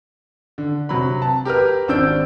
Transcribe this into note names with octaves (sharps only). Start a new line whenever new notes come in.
D3
C3 F#3 B5
A5
G4 A#4 B4 F6
G#1 C4 D4 E6 G6 D7